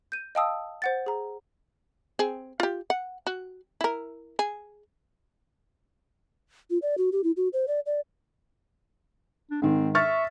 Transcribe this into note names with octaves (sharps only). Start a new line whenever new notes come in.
G6 D#7
D#5 F5 G5 A5 D#6 E6
C5 F#5 A6
G#4 A#5
C4 G#4
F4 G4
F#5
F#4
E4 A#4
G#4
F4
D5
F#4
G4
E4
F#4
C5
D5
D5
D4
G#2 D#3 C4
E5 C#6 F6 A6